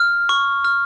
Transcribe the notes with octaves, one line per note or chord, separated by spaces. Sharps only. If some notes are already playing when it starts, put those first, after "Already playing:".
Already playing: F6
C#6
F6